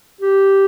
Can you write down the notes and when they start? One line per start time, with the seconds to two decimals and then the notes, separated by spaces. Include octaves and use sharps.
0.21 G4